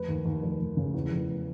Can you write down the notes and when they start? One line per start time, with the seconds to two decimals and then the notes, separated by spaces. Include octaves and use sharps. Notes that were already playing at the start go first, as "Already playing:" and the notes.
Already playing: F1 B4
0.08 D#2
0.25 D#2
0.42 F1
0.60 F1
0.77 C#3
0.94 E2
1.11 F1